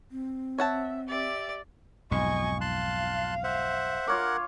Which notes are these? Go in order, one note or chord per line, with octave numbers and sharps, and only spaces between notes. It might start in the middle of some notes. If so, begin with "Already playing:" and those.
C4
C#5 E5 F#5 A5
G4 D5 E5
B1 F2 G#2 D#5 G#5 C#6
F5 A5 C6 F#6
C5 E5 F#5
F4 A#4 C#5 F#5 D6